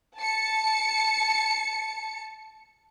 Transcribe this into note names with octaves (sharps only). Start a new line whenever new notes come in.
A5 C#7